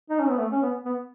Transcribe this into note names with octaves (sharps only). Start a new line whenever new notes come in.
D#4
C#4
B3
A3
C#4
B3
B3